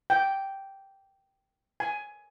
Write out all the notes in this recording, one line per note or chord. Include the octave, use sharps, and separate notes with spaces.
G5
G#5